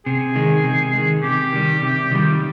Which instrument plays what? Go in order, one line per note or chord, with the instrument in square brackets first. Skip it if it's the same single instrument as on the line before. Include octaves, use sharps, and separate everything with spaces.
[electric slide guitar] C3 [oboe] G#4
[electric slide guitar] D#3 G#3
C3
D#3 G#3
[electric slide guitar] C3 [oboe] G4
[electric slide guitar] D#3 G3
C3
D#3 G3